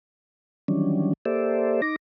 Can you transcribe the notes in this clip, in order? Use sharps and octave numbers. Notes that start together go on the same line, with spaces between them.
D#3 E3 F#3 G3 C#4 D4
A#3 G4 A4 C5 D5 E5
D#4 D6 A#6